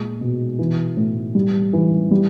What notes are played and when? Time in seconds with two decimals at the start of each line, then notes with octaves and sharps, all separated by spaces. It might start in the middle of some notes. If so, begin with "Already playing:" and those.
Already playing: A#2 G#3
0.21 B2
0.59 E3
0.97 A2
1.35 G3
1.73 E3
2.11 G3